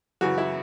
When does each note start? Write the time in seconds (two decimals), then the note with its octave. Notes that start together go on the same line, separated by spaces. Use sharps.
0.21 F#2 C#3 E3 F#4
0.38 E4